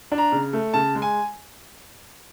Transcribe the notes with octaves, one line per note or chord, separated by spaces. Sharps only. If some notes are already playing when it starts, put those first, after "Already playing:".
D4
A#5
C#3
A3
C#3 A5
G#3
G#5